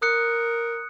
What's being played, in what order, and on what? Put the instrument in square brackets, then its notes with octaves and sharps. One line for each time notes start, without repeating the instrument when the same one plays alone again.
[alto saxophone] A#4 [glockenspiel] D#6 F#6 C#7